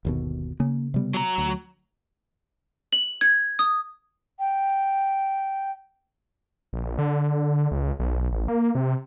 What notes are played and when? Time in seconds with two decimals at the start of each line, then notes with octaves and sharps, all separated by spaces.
0.05 G1 D#2 B2
0.60 C#3 A#3
0.94 C3 G3 B3
1.14 F#3 A#5
1.38 D2
2.93 F#7
3.21 G#6
3.59 D#6
4.38 G5
6.73 A#1
6.98 D3
7.71 C#2
7.99 B1
8.32 A1
8.48 A#3
8.75 C3